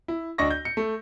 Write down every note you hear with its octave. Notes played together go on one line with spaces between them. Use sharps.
E4
D2 D4 D#5 C#6 A#6
G6
C#7
A3